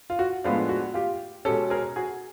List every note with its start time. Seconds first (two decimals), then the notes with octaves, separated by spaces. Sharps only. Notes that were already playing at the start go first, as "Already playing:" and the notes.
0.10 F4
0.19 F#4
0.44 A2 F3 G#3 B3 D4 F4
0.69 F#4
0.94 F4 G4
1.45 B2 G#3 C#4 G4 A4
1.70 G#4 A#4
1.96 F#4 G#4